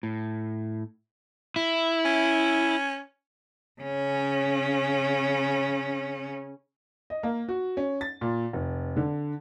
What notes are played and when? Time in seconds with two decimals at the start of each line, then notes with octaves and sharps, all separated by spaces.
0.03 A2
1.56 E4
2.05 C#4
3.81 C#3 C#4
7.10 D#5
7.23 A#3
7.49 F#4
7.77 C#4
8.01 A6
8.21 A#2
8.53 F1
8.97 D3